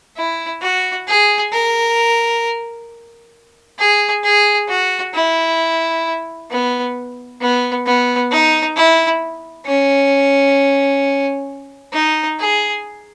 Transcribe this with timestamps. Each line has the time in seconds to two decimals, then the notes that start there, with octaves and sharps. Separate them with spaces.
0.17 E4
0.62 F#4
1.08 G#4
1.52 A#4
3.79 G#4
4.24 G#4
4.69 F#4
5.14 E4
6.50 B3
7.41 B3
7.86 B3
8.31 D#4
8.76 E4
9.66 C#4
11.93 D#4
12.39 G#4